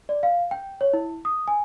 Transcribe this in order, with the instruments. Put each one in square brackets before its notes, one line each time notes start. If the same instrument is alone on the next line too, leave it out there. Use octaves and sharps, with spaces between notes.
[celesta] D5
F5
G5
C#5
E4
D#6
G#5